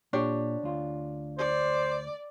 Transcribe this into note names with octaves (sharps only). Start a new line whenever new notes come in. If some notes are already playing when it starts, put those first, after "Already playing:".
A#2 D4 G4 C#5
D2 F4
C5 D5